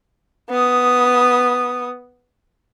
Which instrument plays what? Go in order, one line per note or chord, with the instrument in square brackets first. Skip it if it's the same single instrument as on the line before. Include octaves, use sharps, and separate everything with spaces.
[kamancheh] B3 D#6